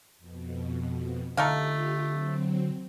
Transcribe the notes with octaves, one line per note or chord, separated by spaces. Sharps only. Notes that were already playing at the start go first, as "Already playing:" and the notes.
F2 B2
D3 A3 D#4 F4 G4 F5
F#3 C4